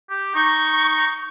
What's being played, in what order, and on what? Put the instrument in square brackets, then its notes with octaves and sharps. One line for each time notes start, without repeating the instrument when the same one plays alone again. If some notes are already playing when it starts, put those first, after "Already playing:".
[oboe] G4
[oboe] D#4 [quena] C#6